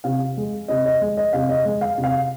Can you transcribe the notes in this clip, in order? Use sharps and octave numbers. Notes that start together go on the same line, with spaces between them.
C3 F5
G#3
C3 D#5
D#5
G#3
D#5
C3 F5
D#5
G#3
F5
C3
F5